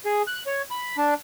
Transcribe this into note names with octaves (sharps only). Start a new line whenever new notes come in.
G#4
F#6
C#5
B5
D4